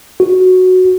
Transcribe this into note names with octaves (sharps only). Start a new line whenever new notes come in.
F#4